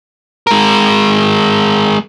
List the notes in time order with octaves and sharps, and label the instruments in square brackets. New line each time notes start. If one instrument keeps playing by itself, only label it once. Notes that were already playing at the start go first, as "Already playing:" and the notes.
[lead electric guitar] G#3 A#4